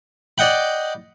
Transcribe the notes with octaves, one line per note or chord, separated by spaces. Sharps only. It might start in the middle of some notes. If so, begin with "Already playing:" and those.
D5 D#5 F#5 G5 B5